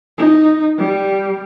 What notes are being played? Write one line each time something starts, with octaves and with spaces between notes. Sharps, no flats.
D#4
G3